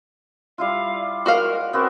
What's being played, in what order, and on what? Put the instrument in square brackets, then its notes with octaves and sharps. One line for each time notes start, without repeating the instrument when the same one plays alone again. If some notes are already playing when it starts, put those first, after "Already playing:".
[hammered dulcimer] G3 E4 F4 [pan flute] F5
[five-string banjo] F#4 D#5 F5 [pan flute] A#4
[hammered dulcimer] B3 C4 F#4 [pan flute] A#4